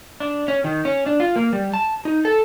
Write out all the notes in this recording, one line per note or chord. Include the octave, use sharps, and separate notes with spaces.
D4
C#4
D#3
C#4
D4
F4
A#3
G3
A5
D#4
A4